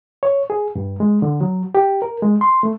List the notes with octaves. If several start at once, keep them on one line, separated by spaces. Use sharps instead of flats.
C#5
G#4
G2
G#3
D3
F#3
G4
A#4
G#3
C6
A3